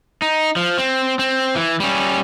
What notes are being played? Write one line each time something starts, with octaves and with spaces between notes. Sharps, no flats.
D#4
F3
C4
C4
E3
G3 C#4